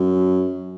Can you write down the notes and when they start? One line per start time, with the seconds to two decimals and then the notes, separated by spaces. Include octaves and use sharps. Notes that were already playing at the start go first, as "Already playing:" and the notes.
Already playing: F#2